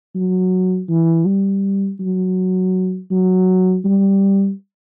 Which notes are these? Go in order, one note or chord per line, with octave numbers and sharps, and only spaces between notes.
F#3
E3
G3
F#3
F#3
G3